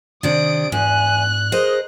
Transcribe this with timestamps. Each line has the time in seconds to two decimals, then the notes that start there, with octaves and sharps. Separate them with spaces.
0.23 C3 D#3 D4 D#6 D7
0.72 E2 G#2 G#5 F#6
1.52 G#4 A#4 C5 D#5